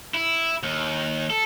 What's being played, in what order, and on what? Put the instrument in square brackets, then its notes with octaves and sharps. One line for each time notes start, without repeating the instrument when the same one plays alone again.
[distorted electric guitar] E4
D#2
A4